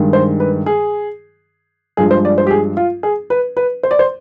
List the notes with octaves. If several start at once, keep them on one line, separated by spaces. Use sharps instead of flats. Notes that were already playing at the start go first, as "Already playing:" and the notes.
Already playing: G2 D#3 G#3
C5
B4
G#4
G2 F3 G#3 G#4
C5
D5
C5
G4
G#4
F4
G#4
B4
B4
C5
D5
C5